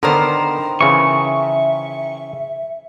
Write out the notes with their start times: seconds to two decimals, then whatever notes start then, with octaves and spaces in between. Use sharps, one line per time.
0.03 D3 D#3 B3 A#4 C5
0.81 C#3 E3 E5 C#6